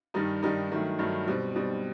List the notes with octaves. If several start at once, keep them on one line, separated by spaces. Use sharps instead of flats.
G2 D#3 G3 D#4
G2 D#3 G3 D#4
G2 D#3 F#3 A3
G2 D#3 F#3 A3
B2 G3 C4
B2 G3 C4